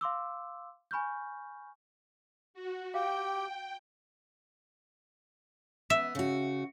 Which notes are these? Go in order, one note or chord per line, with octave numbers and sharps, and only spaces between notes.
F5 C6 D6 E6
G#5 B5 C#6 F6 G6
F#4
G4 F5 G5
B3 E5
C#3 F#4